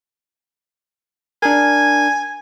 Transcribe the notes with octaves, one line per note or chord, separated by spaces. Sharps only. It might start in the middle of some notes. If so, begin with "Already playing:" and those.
D4 A#4 G#5